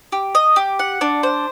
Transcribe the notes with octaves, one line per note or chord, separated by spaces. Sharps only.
G4
D#5
G4
F#5
D4
C5